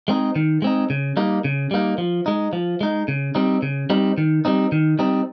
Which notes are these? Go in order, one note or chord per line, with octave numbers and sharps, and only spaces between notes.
G#3 C4 D#4
D#3
G#3 C4 D#4
C#3
G3 A#3 D#4
C#3
G3 A#3 D#4
F3
G#3 D#4
F3
G#3 D#4
C#3
G3 C4 D#4
C#3
G3 C4 D#4
D#3
G3 C4 D#4
D#3
G3 C4 D#4